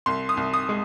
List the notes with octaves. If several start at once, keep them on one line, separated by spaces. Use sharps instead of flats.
C2 C6
D#6
C2
D#6
G#3